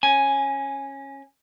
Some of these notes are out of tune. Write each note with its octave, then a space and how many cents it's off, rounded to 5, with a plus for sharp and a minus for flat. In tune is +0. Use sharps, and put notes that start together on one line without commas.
C#4 -20 G#5 +0